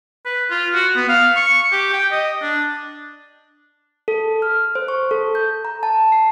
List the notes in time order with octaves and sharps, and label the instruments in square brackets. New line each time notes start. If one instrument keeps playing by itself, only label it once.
[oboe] B4
F4
F#4
B3
F5
C#6
G4
G5
D#5
D4
[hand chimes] A4
F6
C5
C#6
A4
G6
A#5
A5
C7